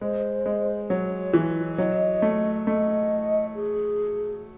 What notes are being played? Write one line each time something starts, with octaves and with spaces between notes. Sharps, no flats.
G#3 C5
G#3
F#3 C#5
E3
F#3 D#5
A3
A3 D#5
G#4